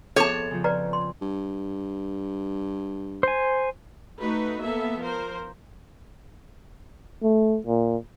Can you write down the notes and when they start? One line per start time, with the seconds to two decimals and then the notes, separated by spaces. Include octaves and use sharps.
0.16 F2 B3 G#4 A4 C#5 A5
0.51 C#3 F3
0.64 B4 D5 A#5
0.93 C6
1.21 G2
3.23 C5 G#5
4.20 A3 D#4 F#4 B4
4.62 A#3 B3 A4 E5
5.00 F3 A#4 C5
7.23 A3
7.66 A#2